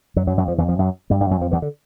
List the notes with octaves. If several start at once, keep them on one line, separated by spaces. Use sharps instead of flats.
F#2 F#3
F#2 F#3
F#2 F#3
F2 F3
E2 E3
F2 F3
F#2 F#3
G2 G3
G2 G3
F#2 F#3
F2 F3
E2 E3
D3